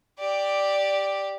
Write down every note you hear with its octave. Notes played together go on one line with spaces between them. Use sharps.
G4 D5